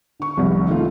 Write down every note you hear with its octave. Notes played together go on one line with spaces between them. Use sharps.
D3 C#6
F1 C2
D#3 A3 F4